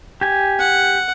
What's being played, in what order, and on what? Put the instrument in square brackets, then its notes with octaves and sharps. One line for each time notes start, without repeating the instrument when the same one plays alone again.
[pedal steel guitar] G4 G#5
[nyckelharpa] F#5